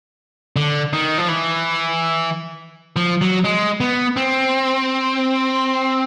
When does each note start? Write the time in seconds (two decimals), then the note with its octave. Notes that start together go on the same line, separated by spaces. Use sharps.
0.56 D3
0.93 D#3
1.18 F3
1.28 E3
2.96 F3
3.21 F#3
3.44 G#3
3.80 B3
4.17 C4